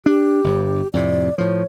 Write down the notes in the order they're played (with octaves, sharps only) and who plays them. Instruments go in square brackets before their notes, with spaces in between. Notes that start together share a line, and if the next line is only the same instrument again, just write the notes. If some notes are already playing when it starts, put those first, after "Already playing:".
[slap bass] D4 [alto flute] G4
[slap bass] G1 G2
[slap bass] F2 A2 C3 [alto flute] D5
[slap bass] A2 F3 [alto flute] C#5